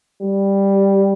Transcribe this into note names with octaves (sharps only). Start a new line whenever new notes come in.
G3